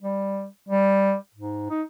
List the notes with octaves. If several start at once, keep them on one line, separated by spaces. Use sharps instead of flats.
G3
G3
G#2
D#4